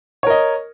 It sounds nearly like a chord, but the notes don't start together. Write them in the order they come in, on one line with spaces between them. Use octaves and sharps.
C#5 A#4 D#5